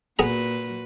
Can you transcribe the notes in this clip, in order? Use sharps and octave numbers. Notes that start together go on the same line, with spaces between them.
A#2 B3 F#4 G#4 B4 A#5